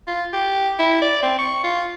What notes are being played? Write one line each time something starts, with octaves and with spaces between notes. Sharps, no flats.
F4
G4
E4
D5
C4
C#6
F4